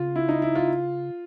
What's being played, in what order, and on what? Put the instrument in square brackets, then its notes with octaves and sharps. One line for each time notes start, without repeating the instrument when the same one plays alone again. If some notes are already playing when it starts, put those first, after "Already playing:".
Already playing: [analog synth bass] C#3 [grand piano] F4
[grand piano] E4
D#4
E4
F4